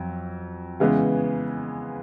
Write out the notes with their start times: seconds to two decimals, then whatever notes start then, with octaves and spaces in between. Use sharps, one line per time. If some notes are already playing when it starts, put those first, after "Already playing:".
Already playing: F2 F#3
0.80 C#3 E3 G#3 B3